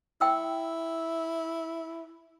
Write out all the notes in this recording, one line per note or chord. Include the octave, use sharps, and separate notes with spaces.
E4 G5 E6